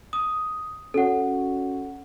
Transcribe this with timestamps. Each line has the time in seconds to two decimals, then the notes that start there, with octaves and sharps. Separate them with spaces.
0.13 D#6
0.94 C#4 F#4 A4 C#5 F#5